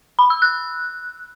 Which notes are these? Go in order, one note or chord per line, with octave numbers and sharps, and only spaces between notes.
B5
E6
F#6